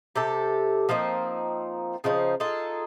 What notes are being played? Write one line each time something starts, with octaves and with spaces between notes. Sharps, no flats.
C3 G4 A4
F3 A#3 C4 D#4
C#3 F3 D#4 C5
D#4 F4 G#4 A4